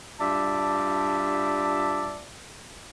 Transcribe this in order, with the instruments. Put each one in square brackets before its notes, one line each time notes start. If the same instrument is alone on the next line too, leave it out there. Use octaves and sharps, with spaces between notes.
[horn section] G2 F4 D5 E5 A5